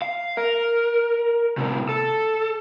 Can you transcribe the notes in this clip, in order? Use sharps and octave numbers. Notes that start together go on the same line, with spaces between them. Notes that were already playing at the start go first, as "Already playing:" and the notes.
F5
A#4
A2 C3
A4